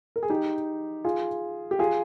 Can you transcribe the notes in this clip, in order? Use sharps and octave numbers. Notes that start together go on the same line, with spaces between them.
A#4
G#4
D#4 G4
F4 G#4
G4
F4 G#4